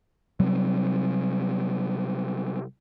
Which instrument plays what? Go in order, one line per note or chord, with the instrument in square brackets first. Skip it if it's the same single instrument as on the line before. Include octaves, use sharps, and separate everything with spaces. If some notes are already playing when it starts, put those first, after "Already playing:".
[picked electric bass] C3 F#3 G3 C4